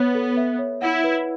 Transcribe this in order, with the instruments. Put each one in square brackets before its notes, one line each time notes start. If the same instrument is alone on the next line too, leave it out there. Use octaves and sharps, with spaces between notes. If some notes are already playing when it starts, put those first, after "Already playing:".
Already playing: [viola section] B3 [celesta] C#5
[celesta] A4
E5
C#5
[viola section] E4 [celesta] F#5
[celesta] B4